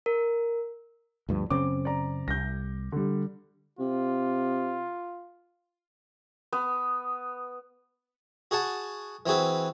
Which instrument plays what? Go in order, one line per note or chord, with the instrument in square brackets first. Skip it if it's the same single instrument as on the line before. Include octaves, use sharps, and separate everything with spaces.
[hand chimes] A#4
[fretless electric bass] D2 G2 F3
[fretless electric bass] F#2 C#3 C4 [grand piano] D6
[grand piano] D5 A#5
[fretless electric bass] C2 [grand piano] G6 A#6
[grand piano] D3 G3
[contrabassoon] C3 [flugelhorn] F4
[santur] B3
[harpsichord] F#4 G#4 F#5 A5
E3 C4 F#4 G#4 B4